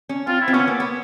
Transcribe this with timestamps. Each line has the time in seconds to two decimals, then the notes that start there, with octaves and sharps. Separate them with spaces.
0.09 C#4
0.27 C4 F4
0.41 E4
0.48 C4
0.54 B3 C#4
0.68 A#3
0.80 B3